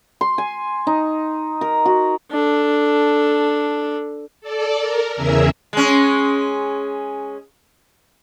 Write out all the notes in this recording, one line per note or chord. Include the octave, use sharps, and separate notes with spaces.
C6
G#5
D#4
A#4
F#4
D4 A4
A4 D5
A#4
E2 C#3 G#4 A#4 E5 E6
G#3 C#4